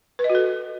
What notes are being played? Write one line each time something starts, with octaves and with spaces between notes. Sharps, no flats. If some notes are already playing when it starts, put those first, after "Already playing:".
B4
D#5
F#4
A4